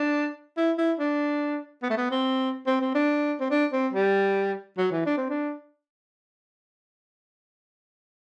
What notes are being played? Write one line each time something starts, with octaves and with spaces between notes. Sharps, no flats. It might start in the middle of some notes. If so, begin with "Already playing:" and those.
Already playing: D4
E4
E4
D4
B3
A3
B3
C4
C4
C4
D4
C4
D4
C4
G3
F#3
E3
D4
C4
D4